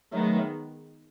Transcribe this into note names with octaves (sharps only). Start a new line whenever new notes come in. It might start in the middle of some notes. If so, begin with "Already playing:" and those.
D#3 F#3 G#3 A3 B3